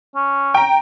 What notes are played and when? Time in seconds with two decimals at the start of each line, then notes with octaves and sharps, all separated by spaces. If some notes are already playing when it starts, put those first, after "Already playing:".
0.15 C#4
0.54 G5 A#5